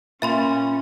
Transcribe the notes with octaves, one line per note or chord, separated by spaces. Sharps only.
A#2 C#4 E5 B5 C6